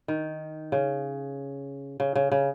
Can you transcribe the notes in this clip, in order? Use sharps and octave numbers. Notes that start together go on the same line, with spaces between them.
D#3
C#3
C#3
C#3
C#3